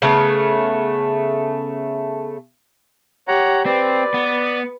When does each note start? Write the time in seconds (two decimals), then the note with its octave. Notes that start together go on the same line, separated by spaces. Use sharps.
0.02 C#3 A3 B3
3.28 G4 C#5 F#5 A#5
3.66 C4 B4 D5
4.14 B3